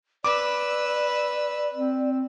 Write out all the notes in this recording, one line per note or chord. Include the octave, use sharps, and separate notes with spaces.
B4 D5 D6 E6
C4